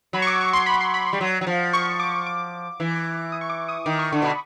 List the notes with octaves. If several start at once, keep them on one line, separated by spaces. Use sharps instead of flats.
F#3 B5
C#6
D6
C#6
C6
B5
C6
B5
C6
G3
F#3
F#3
F3
C#6
D6
D6
E3
D#6
C#6
D6
D#6
D#3 D6
C#6
D3
B2 B5